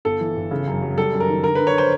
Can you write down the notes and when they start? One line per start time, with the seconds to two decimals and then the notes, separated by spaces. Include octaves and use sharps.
0.05 G1 A4
0.20 E3
0.36 G1
0.51 C#3
0.67 F#2
0.82 F#3
0.97 G3 A4
1.13 F#2
1.20 A#4
1.28 D#3
1.44 D3 A#4
1.55 D3 B4
1.67 C#5
1.78 C5